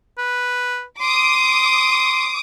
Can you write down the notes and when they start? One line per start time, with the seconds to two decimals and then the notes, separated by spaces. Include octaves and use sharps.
0.18 B4
1.01 C6 D6 D#6